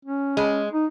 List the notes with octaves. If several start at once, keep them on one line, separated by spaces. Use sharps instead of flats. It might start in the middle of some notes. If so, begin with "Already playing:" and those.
C#4
G#3
D#4